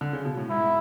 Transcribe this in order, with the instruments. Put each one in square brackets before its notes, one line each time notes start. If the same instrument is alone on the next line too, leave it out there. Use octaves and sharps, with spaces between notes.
[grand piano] D3
C#3
B2
A2
[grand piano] G#2 [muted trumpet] E4